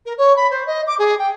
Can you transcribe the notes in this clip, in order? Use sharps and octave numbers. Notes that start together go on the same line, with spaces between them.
A#4
C#5
B5
C5
D#5
D6
G#4
G5